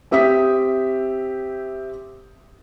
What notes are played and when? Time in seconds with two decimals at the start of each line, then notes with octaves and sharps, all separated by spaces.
0.11 C4 G4 E5 D#6 B6